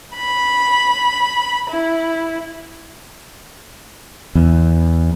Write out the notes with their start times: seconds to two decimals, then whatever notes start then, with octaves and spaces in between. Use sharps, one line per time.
0.14 B5
1.70 E4
4.35 E2